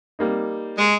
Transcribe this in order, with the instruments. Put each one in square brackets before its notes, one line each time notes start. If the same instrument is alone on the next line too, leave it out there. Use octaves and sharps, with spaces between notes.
[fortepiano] G3 A#3 D#4
[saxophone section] G#3